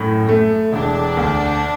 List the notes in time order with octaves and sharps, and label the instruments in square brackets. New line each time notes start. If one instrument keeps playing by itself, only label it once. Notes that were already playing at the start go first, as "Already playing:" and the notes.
Already playing: [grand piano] F#2 A2
A3
[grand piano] E1 [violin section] D4
[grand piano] D2